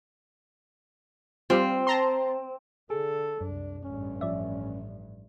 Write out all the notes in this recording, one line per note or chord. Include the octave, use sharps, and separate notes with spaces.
G3 C4 F4
A5 A#5 C6
D3 G#4 A4
C2 F#2 D4
A1 G2 C#4
F3 D5 E5